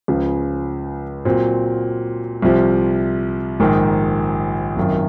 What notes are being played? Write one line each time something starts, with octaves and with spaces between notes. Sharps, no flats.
C#2 C#3 F3
A#2 F#3 C4
C2 C3 F3
A#1 G#2 D#3
G#1 F#2 D#3